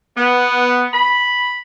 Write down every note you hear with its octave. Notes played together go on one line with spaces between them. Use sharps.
B3
B5